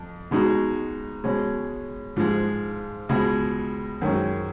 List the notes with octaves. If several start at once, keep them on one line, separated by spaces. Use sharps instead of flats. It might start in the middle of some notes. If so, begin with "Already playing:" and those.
Already playing: F2
B2 G#3 D#4 F#4
B2 G#3 C#4
G#2 F3 G#3
C#2 B2 G#3
F#2 D#3 G#3 C#4 F#4